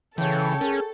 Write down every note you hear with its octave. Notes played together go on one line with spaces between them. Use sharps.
C#3 E3 A4 C#5 G5
C#4 G#4 A#4